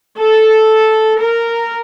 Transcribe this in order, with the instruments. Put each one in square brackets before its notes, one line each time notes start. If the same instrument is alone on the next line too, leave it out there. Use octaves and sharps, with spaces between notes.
[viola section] A4
A#4